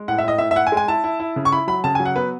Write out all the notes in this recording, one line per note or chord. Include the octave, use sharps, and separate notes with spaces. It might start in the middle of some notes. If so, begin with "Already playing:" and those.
Already playing: G#3
A2 F#5
E5
A2 D#5
A2 E5
E5
E4 F#5
G#5
G#3
G#5
E4 A5
E4
E4
C#3
C#6
E4 B5
F#3 B5
C#3 A5
G#5
F#3
F#5
B3 B4